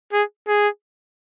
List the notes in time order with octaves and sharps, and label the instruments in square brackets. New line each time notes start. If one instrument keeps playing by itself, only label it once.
[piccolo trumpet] G#4
G#4